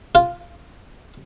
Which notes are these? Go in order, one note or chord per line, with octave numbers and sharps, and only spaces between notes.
F4